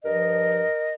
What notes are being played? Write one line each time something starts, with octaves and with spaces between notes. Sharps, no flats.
G2 F3 A#4 D#5